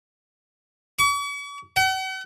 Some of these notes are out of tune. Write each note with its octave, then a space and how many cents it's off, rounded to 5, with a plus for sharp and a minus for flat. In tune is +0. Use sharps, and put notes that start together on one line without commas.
C#6 +45
F#5 +45